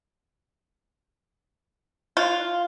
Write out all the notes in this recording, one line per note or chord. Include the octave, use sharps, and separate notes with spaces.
F4